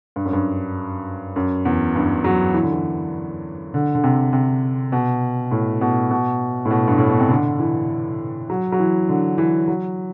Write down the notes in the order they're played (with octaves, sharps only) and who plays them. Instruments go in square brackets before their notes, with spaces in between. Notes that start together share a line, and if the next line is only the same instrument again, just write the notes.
[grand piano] G2
F#2
G2
F#2
E2
G2
F#3
E3
D3
E3
D3
D3
C3
C3
B2
A2
B2
B2
A2
B2
G2
A2
B2
C3
D3
E3
F#3
F#3
E3
D3
E3
F#3